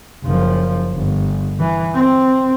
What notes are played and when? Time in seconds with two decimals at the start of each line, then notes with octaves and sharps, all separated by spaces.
0.25 F#1 F3
0.95 G1
1.60 E3
1.95 C4